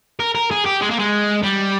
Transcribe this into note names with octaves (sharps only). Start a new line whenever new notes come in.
A#4
A#4
G#4
G4
G#3
A#3
G#3
G3